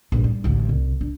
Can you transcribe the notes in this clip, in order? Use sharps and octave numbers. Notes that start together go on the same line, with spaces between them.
A#1 G2
G3
A1 D2
C2
D4